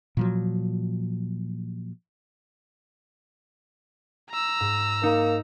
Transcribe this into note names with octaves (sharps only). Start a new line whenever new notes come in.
A#2 F3 F#3
A#5 E6
G#2
A#3 D#4 C#7